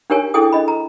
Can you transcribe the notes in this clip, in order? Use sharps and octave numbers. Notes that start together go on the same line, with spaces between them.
D4 D#4 G4 A#4 C#5 G#5
D4 E4 G#4 A4 G5 D#6
D4 D#5 B5
A#5